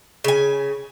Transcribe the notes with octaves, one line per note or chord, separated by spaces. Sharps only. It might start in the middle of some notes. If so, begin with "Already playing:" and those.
C#3 G#5